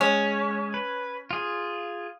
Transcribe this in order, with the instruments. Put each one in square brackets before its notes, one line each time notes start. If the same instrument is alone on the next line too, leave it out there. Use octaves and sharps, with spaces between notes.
[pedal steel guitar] G#3 [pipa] C#4
[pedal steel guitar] B4
F4 G#4